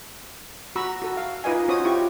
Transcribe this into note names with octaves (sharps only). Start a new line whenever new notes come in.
F#4 A#5 B5 C#6 E6
F#4 A4
F5
D#4 F4 B4 D#5 G#5
C#4 F#4 C5 C#5 D#6
E4 F4 G4 C#6